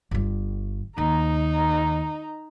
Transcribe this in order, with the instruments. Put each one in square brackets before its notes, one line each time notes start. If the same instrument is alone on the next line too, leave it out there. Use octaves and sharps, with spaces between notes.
[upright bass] G1 G2
[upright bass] D#2 [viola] D#4 A#5